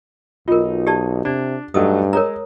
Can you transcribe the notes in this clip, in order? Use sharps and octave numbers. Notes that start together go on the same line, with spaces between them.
B1 D#4 F4 A#4
G4 D5 A5
C3 D4 D5
G2 F#3 A3 D#4 D#6
G#3 A#4 C#5 A#5